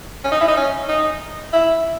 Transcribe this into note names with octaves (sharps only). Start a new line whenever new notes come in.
C#4
D#4
E4
D#4
C#4
D#4
E4